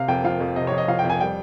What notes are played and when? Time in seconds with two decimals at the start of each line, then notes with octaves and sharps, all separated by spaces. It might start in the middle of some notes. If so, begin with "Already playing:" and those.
Already playing: C3 F5
0.08 F2 G5
0.24 F3 F5
0.40 F2
0.56 C3 D#5
0.67 C#5
0.72 F2
0.78 D#5
0.88 F3 F5
0.99 G5
1.04 F2
1.10 G#5
1.20 G3 G5